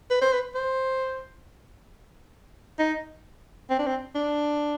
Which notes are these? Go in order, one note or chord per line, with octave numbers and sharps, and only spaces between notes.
B4
C5
B4
C5
D#4
C4
D4
C4
D4